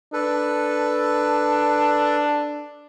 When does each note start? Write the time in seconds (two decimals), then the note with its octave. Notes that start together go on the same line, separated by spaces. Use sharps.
0.13 D4 A4 B4